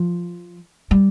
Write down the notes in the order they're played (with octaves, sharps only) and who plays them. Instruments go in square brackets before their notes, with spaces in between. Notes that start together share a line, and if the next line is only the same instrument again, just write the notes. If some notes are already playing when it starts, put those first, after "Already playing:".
Already playing: [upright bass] F3
G3